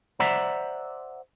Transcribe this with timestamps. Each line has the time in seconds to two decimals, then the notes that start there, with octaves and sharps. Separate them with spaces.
0.20 C5 D5 E5 F#5 A#5